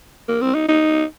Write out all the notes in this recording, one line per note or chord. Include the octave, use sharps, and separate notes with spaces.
A#3
C4
D#4
D#4